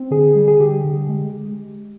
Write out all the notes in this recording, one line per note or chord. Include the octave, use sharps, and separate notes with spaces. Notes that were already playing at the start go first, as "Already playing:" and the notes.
Already playing: C4
D3 G#4
G3
G#4
D3 G4
D3
G#3